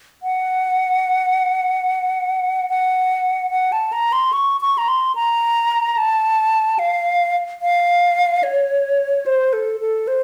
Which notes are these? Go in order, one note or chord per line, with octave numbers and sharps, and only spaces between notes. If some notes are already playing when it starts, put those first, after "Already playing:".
F#5
F#5
F#5
A5
A#5
C6
C#6
C#6
A#5
C6
A#5
A5
F5
F5
C#5
C5
A4
A4
C5